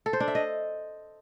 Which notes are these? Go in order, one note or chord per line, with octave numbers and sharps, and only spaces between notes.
A4
C5
D4
E5
D#5